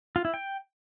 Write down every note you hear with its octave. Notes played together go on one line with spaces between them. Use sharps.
F4
E4
G5